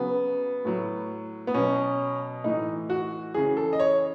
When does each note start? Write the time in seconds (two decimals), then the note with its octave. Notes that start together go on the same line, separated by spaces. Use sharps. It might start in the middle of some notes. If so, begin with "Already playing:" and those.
Already playing: C#3 F#3 B3
0.65 A2 F#3
1.47 B3
1.54 B2 F#3 C#4
2.44 A2 E3 D#4
2.90 F#4
3.34 C#3 E3 G#4
3.57 A4
3.73 D#5
3.80 C#5